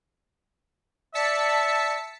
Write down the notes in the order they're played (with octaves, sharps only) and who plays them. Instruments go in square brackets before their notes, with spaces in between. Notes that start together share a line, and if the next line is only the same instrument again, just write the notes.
[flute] D5 [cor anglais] E5 [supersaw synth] A5 B6 C#7